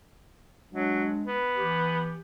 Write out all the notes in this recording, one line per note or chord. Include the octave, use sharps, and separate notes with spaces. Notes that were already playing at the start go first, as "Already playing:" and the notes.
F#3 G#3 D4
B3
E3 G4